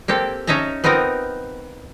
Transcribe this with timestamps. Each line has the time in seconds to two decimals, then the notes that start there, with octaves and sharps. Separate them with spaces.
0.08 A#3 C4 G4 A4
0.47 C#4 D#4 E5 A5 A#5
0.84 B3 C4 D#4 F4 A#4